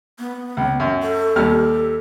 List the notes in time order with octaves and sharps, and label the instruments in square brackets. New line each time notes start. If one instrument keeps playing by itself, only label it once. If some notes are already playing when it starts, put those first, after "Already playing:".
[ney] B3
[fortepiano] C#2
F#2
[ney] A4
[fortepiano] D#2 G3 F6